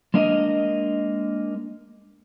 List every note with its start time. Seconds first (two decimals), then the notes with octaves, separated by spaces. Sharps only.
0.14 G#3 A#3 D4 A#4 D#5